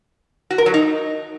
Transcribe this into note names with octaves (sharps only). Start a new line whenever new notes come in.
F#4
A#4
F#3
D#4